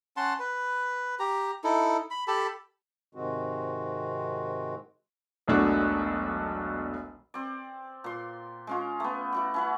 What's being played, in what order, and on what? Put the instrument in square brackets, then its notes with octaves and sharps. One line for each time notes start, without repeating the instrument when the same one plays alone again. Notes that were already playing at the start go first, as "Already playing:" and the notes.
[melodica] C#4 F#5 A5 C6
B4
G4 A#5
D#4 E4 A4
B5
G4 A4 A5 B5
[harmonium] G#2 C3 D#3 G#3 C4 F#4
[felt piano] E1 B1 A3 D4 F#4
[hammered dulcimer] C4 D5
A#2 C6
G#3 C#4 F4
A3 B3
E4 F#4 D5
C#4 E4 F#5